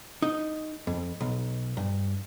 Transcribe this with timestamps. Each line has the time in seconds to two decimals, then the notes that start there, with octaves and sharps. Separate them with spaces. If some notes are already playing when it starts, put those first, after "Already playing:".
0.22 D#4
0.87 F2
1.21 B1
1.77 G2